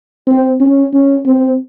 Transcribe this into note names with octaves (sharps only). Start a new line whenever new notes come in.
C4
C#4
C#4
C4